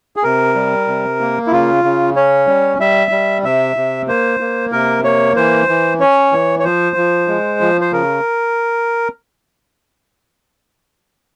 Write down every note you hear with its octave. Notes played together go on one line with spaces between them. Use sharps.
G#4
C3 A#4
G3
C3
A#3
E4
C#3 F4
C#3
C#4 C#5
G3
G3 E5
G3
C3 E5
C3
A#3 C5
A#3
C3 A#4
A#3 C#5
E3 C5
E3
C#4 C#5
E3
C#5
F3 C5
F3
G#3
F3
C5
C#3 A#4